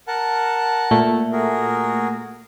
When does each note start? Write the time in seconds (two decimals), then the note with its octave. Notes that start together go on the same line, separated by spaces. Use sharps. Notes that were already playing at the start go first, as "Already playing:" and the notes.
0.08 A#4 F#5 A5
0.91 A#2 A3
1.32 F#4 G#4 A#4